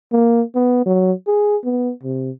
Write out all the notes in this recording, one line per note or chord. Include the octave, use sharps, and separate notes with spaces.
A#3
B3
F#3
G#4
B3
C3